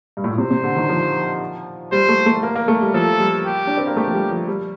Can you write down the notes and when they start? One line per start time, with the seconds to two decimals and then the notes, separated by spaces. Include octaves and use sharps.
0.17 G2
0.24 A2
0.31 A#2
0.38 C3 C5
0.51 C3
0.64 D3
0.76 D#3
0.89 F3
1.92 G3 C5
2.09 A3
2.26 A3
2.43 A#3
2.55 A#3
2.68 A3
2.82 G3
2.93 F3 A4
3.19 G3
3.46 G4
3.67 D4
3.77 C4
3.87 A#3
3.96 A3 G4
4.08 F3
4.14 G3
4.31 F3
4.48 G3